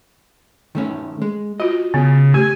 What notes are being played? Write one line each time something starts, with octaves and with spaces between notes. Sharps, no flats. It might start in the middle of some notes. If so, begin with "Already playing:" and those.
D#3 A3 C#4
G#3
F4 F#4 D#5
C#3 B3
A3 G4 G#5